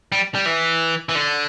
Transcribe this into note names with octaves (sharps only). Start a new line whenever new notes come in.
G3
G3
E3
E3
D3